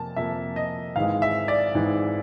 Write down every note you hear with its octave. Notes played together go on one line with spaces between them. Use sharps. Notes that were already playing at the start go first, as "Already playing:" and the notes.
Already playing: F2 C3 A#3 A5
F2 C3 F3 A#3 E5
D#5
G#1 G#2 E3 G#3 F5
E5
D5
G#1 G#2 E3 G#3